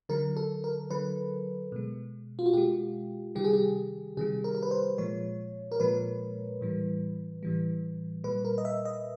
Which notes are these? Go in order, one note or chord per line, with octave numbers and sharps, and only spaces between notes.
D3 F#3 A#4
A4
A#4
D3 F#3 B4
B2 G#3
F4
F#4
B2 G#3 G4
C3 D#3 G3 G4
G#4
G4
C3 D#3 G3 G#4
A#4
A#4
B4
C5
A#2 F3 G#3 C#5
A#4
A#2 F3 G#3 B4
A2 E3 G3
A2 E3 G3
A#2 G3 B4
A#4
D#5
E5
D#5